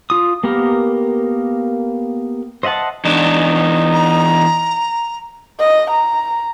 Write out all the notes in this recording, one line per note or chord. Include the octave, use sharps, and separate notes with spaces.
F4 D#6
A#3 B3 G4 A#4
C5 D#5 E5 F#5 A5
E2 D4 D#4
A#5
D#5
A#5